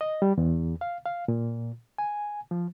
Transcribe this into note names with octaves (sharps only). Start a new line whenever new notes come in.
D#5
G3
E2
F5
F5
A#2
G#5
F3